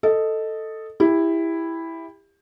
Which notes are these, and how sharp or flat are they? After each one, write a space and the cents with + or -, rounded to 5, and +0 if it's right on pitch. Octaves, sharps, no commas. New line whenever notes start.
A4 +5 D#5 +0
E4 +0 G4 +25